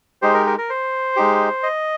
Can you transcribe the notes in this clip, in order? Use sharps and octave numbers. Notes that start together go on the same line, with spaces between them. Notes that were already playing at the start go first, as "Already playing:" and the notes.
G#3 D#4 G4 C5
A#4
A#4
A#4
C5
G#3 D#4 G4
D#5